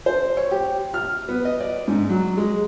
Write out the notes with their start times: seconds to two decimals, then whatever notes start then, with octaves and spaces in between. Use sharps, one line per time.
0.06 C5
0.37 C#5
0.51 G4
0.94 F6
1.29 B3
1.45 D#5
1.60 D5
1.88 G#2
2.09 F#3
2.37 G#3